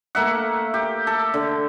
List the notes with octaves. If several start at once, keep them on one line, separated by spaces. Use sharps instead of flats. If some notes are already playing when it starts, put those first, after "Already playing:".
A3 A#3 E5 F#5
G4
A4
D3